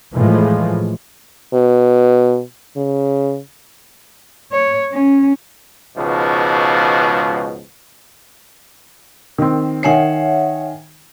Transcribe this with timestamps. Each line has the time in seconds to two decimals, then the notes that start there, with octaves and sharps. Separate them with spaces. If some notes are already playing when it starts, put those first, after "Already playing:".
0.15 A2 E3 F3 G#3
1.54 B2
2.77 C#3
4.53 C#5
4.92 C#4
5.97 C#2 G#2 B2 F3
9.38 D#3 C4
9.83 D#3 C#5 E5 F#5 G#5 C7